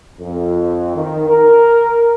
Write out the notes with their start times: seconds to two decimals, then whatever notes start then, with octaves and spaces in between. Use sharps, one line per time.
0.20 F2
0.96 D#3
1.29 A#4